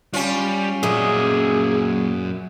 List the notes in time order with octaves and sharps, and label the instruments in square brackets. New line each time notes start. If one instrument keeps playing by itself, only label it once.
[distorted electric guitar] G3 [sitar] C#4 F4
[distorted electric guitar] F#2 D#5 [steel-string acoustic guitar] A#2 E5 [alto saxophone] G#4